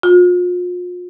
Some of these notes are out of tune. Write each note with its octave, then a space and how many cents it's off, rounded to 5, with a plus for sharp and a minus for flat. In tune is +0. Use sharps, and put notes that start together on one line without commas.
F4 +40